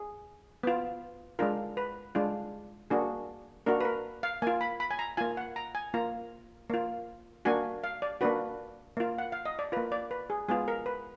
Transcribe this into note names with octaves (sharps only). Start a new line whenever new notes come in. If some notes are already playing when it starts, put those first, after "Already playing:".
Already playing: G#4
B3 F4
G#3 D4 F4 A#4
B4
G#3 D4 F4
A#3 D4 F#4 G#4
A#3 D4 F#4 A#4
B4
A#4
F5
A#3 F4 G#5
B5
B5
G#5
A#5
A#3 F4 G#5
F#5
A#5
G#5
A#3 F4 A#5
A#3 F4
A#3 D4 F#4 G#5
F5
D5
A#3 D4 F#4 B4
A#3 F4
F#5
F5
D#5
D5
A#3 F4 B4
D5
B4
G#4
G#3 B3 F4 G#4
A#4
B4